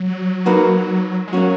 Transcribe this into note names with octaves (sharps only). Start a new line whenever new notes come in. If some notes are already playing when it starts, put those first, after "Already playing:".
Already playing: F#3
A#3 D#4 F#4 B4
G#3
F#3 A#3 C#4 F#4